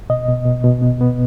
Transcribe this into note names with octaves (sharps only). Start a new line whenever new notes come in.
B2 D#5
B2
B2
B2
B3
B3